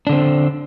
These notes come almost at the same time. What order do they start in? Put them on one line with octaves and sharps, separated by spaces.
D4 D3 C4